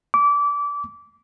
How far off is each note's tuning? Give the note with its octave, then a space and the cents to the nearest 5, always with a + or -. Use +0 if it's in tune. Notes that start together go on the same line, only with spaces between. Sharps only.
D6 -25